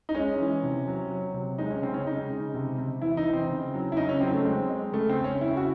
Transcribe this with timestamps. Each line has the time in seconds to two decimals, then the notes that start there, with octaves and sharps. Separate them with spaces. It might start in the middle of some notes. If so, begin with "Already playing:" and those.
0.09 D#4
0.15 G#3 C#4
0.40 E3
0.63 C3
0.88 F#3
1.10 F#3
1.34 C3
1.58 G#3 D#4
1.71 C#4
1.82 C#3 C4
1.94 C#4
2.06 G#3 D#4
2.30 C#3
2.54 C3
2.78 C3
3.02 E3 E4
3.17 D#4
3.25 E3
3.33 C4
3.50 C#3
3.74 F#3
3.92 E4
3.97 C#3 D#4
4.09 C#4
4.21 F#3 C4
4.33 A3
4.45 G#3 C4
4.70 G#3
4.92 C#3 A3
5.09 C4
5.16 C#3
5.24 C#4
5.41 C#3 E4
5.57 F#4